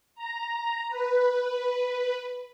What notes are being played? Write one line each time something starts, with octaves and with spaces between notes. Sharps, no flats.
A#5
B4